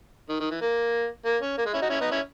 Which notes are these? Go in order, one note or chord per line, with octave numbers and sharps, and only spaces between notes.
D#3
D#3
E3
A#3
A#3
C#4
A#3
G#3
C#4 E4
D#4 F#4
C#4 E4
B3 D#4
C#4 E4